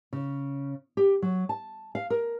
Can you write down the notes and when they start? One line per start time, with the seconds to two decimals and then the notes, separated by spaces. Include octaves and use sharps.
0.13 C#3
0.97 G4
1.22 F#3
1.49 A5
1.95 F5
2.10 A#4